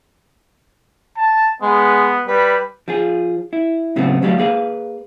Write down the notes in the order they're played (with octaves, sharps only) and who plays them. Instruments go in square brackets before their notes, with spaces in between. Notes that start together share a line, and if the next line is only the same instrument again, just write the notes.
[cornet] A5
[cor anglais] G#3 [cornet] B3
[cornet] G3 [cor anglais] B4
[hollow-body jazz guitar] F3 F4 G#4
E4
A2 C#3 F#3 A3 B3 C4
D2 F#3 G3 A3 A4 F5
A#3 G#4 B4 F5